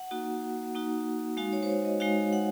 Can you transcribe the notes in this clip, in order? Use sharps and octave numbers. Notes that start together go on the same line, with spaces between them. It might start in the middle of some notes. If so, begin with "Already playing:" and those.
Already playing: F#5
A#3 D#4 F#4
A#3 D#4 F#4
G#3 D#4 F#4 F5
C#5
C5
C#5
D#5
G#3 D#4 F#4 F5
F#5